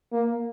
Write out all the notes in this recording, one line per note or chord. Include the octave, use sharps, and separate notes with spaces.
A#3